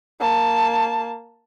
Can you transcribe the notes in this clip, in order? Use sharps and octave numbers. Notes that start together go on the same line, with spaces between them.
A#3 A5